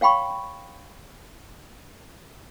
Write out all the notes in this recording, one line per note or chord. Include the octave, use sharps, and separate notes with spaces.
C#5 F5 G5 B5 C#6